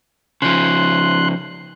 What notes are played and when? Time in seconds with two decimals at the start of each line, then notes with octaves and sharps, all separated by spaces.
0.42 C#3 F3 C6 F#6